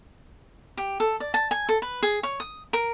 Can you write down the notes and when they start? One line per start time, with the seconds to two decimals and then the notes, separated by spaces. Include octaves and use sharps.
0.77 G4
1.00 A4
1.20 D5
1.34 A5
1.51 G#5
1.69 A4
1.82 B4
2.03 G#4
2.23 C#5
2.40 D#6
2.73 A#4